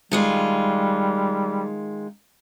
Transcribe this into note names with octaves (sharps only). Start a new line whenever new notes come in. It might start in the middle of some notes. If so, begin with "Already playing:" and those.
D#3 G3 G#3 F4